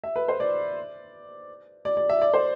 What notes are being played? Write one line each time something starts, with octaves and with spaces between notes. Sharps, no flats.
E5
B4
C5
D5
D5
D5
E5
D5
C5